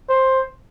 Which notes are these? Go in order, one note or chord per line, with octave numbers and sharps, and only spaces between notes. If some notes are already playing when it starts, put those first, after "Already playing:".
C5